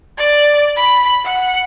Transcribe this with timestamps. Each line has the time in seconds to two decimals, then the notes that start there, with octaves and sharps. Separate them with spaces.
0.18 D5
0.77 B5
1.25 F#5